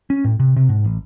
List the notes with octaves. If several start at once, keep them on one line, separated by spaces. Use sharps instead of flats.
C#4
A2
C3
C3
G#2
A1